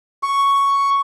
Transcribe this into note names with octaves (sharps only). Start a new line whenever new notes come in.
C#6